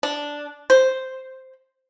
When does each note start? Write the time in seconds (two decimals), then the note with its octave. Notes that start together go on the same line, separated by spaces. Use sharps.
0.03 D4
0.70 C5